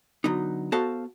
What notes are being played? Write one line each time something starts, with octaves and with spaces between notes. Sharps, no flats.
D3 F#3 B3 D#4
B3 F#4 A4 C5 F5 A5